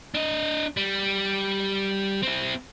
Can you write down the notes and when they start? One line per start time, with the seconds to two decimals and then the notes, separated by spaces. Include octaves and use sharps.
0.15 D4 D#5
0.77 G3
2.23 C4 E4